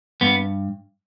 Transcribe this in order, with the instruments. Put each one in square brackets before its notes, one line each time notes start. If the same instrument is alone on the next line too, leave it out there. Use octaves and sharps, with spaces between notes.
[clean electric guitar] G2 B3